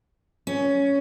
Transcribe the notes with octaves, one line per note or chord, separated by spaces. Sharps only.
C#4